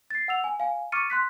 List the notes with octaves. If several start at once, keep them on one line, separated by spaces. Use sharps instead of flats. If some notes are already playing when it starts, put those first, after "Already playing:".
A6 C7
F#5 E6 F7
G#5
F5 G#5
C#6 D6 F6 A6 C#7 D#7
C6 F#6 B6